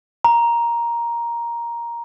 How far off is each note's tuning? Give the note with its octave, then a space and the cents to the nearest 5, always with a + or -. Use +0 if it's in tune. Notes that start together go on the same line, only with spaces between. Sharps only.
A#5 +10